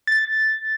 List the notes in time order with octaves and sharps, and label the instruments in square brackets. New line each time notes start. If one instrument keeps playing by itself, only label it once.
[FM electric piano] A6